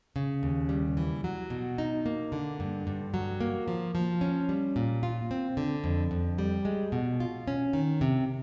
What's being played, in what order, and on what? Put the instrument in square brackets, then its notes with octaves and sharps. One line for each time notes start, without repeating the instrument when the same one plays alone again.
[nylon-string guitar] C#3
D#2
G3
E3
F#3
B2
D#4
A#3
D3
G2
G2
F#3
A#3
F3
F3
C#4
G3
A#2
F4
C4
D3
F2
F2
G3
G#3
B2
F4
C#4
D#3
C3